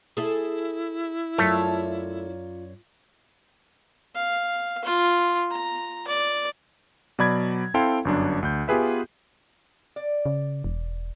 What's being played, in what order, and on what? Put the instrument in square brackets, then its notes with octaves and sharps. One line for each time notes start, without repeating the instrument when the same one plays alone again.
[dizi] E4 [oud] G#4 A4 E5
[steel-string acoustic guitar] F#2 C#5 D5 [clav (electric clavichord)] A3 [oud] F4
[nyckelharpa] F5
F4
A#5
D5
[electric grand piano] B2 F#3 D5 B5 G#6
C4 E4 A4 F5 G5 C6
G1 F#2 D4
D2 G6
B3 F4 G4 G#4 B4 E5
[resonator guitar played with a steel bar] D5
[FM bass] C#3
E1